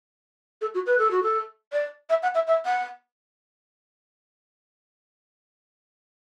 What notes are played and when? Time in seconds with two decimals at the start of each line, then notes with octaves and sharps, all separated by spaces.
0.61 A4
0.74 F#4
0.86 B4
0.98 A4
1.11 F#4
1.23 A4
1.73 D5
2.10 E5
2.23 F#5
2.35 E5
2.47 E5
2.66 F#5